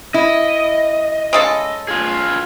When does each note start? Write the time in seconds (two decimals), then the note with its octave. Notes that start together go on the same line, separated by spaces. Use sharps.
0.14 E4 D#5
1.33 C#3 G#3 A4
1.88 F4 G#4